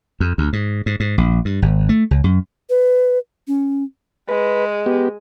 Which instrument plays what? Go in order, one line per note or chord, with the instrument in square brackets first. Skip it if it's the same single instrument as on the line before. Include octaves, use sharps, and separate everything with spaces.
[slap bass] F2
D2
G#2
G#2
G#2
A#1
G2
G#1
A3
C#2
F#2
[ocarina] B4
C#4
[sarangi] G#3 [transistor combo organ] B4
[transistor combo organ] B3 G4